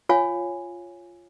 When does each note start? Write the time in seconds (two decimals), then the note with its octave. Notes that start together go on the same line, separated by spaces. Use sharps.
0.09 F4 C#5 F5 G#5